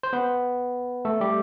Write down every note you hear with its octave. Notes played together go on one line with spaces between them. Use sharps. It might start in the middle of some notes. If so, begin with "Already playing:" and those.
C5
B3 B4
A3 A4
G3 G4